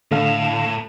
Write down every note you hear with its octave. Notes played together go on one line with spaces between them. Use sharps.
A2 D3 A3 F5